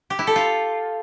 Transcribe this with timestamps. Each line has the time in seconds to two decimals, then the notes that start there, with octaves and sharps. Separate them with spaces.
0.10 G4
0.19 E4
0.27 A4
0.36 F4